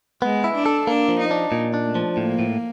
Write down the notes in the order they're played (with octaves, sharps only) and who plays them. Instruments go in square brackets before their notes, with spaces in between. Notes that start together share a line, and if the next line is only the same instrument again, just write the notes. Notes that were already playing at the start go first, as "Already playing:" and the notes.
[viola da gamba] G#3 [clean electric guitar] B3
[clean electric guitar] E4
[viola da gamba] D4
[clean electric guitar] A4
[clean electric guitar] A#3 [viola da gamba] D4
[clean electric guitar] F3
[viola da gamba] D#4
[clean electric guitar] D4
A#2
D4
[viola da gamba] A3
[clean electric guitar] F3
[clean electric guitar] A2 [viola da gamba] A#3
[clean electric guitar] A2